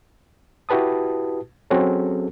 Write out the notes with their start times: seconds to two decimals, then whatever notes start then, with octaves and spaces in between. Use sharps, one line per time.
0.69 E4 F#4 G4 B4 A5 D#6
1.70 F#3 C4 C#4 F#4 G#4 A4